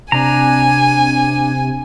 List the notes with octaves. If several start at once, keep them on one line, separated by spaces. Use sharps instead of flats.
C3 D4 G#5 A#5